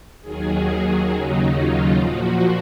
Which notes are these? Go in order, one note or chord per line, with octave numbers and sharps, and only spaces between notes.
D#2 D#3 F#3 G#4
D#2 C#3 F#3 D#4
F4
A#2 F3 F#4